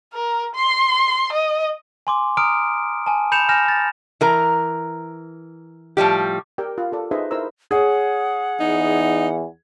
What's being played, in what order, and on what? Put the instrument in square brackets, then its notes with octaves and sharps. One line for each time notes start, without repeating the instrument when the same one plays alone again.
[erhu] A#4
C6
D#5
[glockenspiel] G#5 C6 D6
A#5 D#6 F6 D7
G#5 A5
B5 G6 C#7 E7 F7
G#5 F6 G6 A#6 E7
A6
[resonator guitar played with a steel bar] E3 A#4 A#5
A2 F3 G3 G4
[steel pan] G4 A#4 D5 G5 E6
F4
F4 A4 D5
D#4 G#4 B4 C5 D#5 E5
E4 A#4 C5 A#5 E6
[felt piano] G#4 C#5 [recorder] F#5
[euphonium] E2 [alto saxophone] D#4